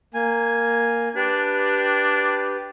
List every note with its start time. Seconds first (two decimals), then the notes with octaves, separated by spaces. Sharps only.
0.14 A#3 G#5
1.16 D4 G4 B4